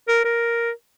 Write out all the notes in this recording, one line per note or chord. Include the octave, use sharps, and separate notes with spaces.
A#4
A#4